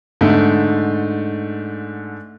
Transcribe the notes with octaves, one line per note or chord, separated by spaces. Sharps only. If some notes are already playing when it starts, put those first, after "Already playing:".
G#2 D3 A3